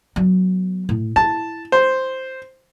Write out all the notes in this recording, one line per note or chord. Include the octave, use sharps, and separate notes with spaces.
F#3 B3
A2
E4 A5
C5